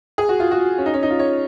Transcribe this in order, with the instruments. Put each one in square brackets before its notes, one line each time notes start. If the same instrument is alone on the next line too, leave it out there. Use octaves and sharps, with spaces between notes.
[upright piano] G#4
F#4
F4
F#4
C#4
D#4
C#4
D#4
F4
C#5